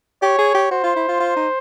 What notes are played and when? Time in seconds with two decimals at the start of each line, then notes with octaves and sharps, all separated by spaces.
0.22 G4 C#5
0.39 G#4
0.55 G4
0.71 F#4 C5
0.83 F4
0.96 E4
1.09 F4
1.20 F4
1.36 D#4